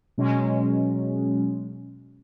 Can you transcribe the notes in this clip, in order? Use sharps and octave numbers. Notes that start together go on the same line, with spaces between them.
B2 F#3 G#3 C#4